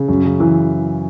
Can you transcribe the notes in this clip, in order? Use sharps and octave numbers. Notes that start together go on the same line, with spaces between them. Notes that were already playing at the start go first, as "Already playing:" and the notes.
Already playing: C#3
F#2
C#3
E3